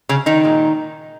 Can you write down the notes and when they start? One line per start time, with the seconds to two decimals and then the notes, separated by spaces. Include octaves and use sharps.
0.09 C#3 C#4
0.26 D#3 D#4
0.43 A#2 G#3